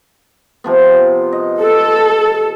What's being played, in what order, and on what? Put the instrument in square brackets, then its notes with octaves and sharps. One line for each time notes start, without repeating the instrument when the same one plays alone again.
[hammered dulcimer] C3 F3 B3
D#5
[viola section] A4